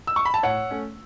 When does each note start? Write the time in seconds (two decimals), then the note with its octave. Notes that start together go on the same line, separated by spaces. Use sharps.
0.07 E6
0.16 C#6
0.25 B5
0.34 A5
0.43 A2 C#5 F#5
0.71 A3 C#4